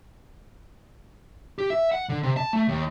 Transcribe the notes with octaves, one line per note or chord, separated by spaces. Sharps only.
G4
E5
F#5
D3
C3
A5
A3
D#2